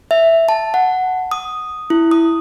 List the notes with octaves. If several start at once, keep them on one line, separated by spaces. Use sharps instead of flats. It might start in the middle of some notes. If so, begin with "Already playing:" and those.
E5
A5
F#5
D#6
E4
D#6